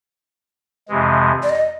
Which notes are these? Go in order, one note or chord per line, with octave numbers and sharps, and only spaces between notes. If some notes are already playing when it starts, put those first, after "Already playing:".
F2 C3 E3 G#3
D5
D#5